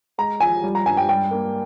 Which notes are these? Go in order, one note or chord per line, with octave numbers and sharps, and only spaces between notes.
G#3 A#5
F3 G#5
G3
A#5
G2 G#5
G5
G3 G5
A#3